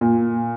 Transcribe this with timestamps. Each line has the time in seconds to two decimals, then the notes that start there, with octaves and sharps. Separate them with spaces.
0.01 A#2